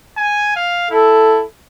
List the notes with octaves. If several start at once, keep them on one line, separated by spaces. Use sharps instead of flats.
G#5
F5
E4 A4